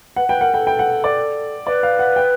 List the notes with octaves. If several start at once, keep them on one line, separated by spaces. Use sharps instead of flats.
B4 F#5
B4 G5
A#4 F#5
A4 G5
G5
F#5
D5
B4 D5
F5
F#5
G5